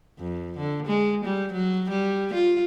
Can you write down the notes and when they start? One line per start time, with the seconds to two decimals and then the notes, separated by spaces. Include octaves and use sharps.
0.19 F2
0.57 D3
0.86 G#3
1.24 G3
1.53 F#3
1.90 G3
2.34 F4